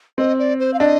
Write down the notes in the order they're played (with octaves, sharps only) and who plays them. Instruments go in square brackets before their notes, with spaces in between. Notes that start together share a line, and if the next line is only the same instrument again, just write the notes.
[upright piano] C4 [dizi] D#5
[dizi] D5
C5
F5
[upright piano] D4 [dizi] D#5